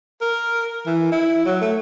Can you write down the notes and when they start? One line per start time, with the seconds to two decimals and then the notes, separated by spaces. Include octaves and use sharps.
0.21 A#4
0.86 E3
1.12 E4
1.46 F#3
1.61 A3